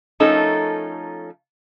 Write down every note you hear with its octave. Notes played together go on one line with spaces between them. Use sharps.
F3 A3 C#4 D#4 A4 A#4